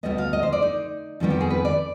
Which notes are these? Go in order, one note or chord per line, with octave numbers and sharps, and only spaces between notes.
D2 C3 G3 B3 D#5
F5
D#5
C5
D5
D#4
F2 D#3 G3 B3 F4
G4
G#4
B4
D5